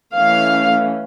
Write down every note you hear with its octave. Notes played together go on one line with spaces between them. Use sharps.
E3 A3 C#4 F5